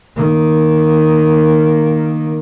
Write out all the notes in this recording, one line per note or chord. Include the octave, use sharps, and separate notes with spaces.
D#3 A#3